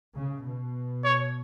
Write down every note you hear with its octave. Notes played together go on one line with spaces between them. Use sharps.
C#3
B2
C#5